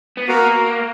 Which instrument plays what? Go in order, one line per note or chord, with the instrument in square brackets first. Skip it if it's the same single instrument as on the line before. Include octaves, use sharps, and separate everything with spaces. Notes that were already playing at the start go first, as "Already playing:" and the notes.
[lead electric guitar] B3
[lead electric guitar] A#3 [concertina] F#4 A#4